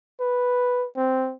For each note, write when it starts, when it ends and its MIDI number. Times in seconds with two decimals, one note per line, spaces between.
0.20 0.86 71
0.96 1.34 60